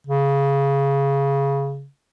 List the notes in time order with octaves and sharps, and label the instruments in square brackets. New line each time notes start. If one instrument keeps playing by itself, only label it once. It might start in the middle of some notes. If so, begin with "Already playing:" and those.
[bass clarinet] C#3